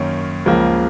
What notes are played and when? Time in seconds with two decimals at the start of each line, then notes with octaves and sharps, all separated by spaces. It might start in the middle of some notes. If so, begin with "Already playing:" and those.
Already playing: F#2 D#3 A#3 C#4
0.46 C#2 C#3 F3 A#3